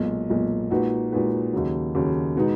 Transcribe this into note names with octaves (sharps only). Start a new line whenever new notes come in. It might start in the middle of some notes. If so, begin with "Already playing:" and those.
Already playing: B1 A#2 G#3
B1 A#2 G#3
A#2 G#3 D#4 F#4 B4
A#2 G#3 D#4 F#4 B4
D#2 C#3 F#3
D#2 C#3 F#3
B2 G#3 B3 D#4